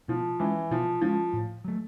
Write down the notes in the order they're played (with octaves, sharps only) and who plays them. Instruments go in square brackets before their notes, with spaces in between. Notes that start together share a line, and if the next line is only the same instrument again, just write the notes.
[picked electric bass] B2 [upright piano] F3
[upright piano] E3 [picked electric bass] G#3 C#4
[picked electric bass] B2 [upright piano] F3
[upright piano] F3 [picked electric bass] G#3 C#4
[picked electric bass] A2
F#3 A3